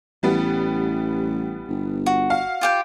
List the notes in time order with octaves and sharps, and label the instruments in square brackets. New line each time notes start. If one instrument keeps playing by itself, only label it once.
[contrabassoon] A1 [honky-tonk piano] E3 G3 B3
[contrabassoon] G1
[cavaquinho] F#4
[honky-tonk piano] F5
[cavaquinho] F4 G4 G5